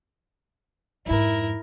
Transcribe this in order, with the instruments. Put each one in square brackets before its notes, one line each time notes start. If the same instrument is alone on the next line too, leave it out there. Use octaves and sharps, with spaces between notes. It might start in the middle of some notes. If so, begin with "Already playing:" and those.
[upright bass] F2 G#2 [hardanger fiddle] E4 A#4